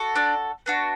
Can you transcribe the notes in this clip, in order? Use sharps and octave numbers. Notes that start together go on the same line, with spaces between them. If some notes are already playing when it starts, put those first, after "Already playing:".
Already playing: F#4 A4
D4 D5
B3 D4 F#4